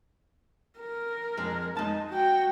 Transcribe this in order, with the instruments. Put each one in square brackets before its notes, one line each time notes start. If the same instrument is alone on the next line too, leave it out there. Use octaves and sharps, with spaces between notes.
[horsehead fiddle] A#4
[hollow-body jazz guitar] F2 G#3
[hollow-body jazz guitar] G#3 A5 [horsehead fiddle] D#4
[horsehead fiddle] F#4 G5